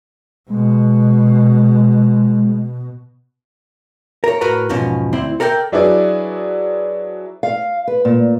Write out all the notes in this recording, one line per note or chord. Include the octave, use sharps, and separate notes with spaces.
B2 G#3
A#4 C#5
A2 F#4 A#4 B4 A#5
E2 G#2 B2 F3 C#4
D2 C4 E4
A4 A#4 D5 F5 G5
F#3 D4 E4 G#4 B4 D5
F5
B4
A#2